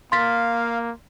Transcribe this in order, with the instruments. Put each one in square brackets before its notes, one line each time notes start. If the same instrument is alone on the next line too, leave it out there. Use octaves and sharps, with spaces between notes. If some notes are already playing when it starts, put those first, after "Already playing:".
[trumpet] A#3 [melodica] F5 [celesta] C6 A6 B6